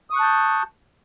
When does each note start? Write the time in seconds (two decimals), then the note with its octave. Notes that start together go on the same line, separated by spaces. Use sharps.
0.10 D#6
0.13 C#6
0.16 F#6
0.20 A5
0.23 G6